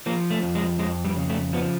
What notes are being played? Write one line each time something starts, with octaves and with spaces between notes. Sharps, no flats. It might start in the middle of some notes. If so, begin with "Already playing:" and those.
F3 A#3
A3
F2
G#3
F2 G#3
G3
C#3
A3
F3 B3